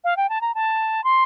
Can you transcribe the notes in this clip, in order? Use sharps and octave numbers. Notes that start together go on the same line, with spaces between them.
F5
G5
A5
A#5
A5
C6